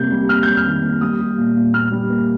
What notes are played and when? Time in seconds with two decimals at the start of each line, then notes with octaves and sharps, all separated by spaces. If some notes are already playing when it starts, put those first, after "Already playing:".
Already playing: C3 G3 A#3 G6
0.11 G3
0.29 A#3 F6
0.43 G3 G6
0.57 F6
0.66 D#3
0.83 A#3
1.01 G3 D#6
1.20 G3
1.38 A#2
1.56 A#2
1.73 A#2 F6
1.92 G3
2.10 A#3